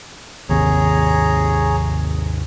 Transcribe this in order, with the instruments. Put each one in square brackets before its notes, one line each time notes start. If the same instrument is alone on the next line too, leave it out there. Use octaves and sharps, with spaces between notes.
[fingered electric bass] G#1 D#2 C3 [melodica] G#4 C#5 A#5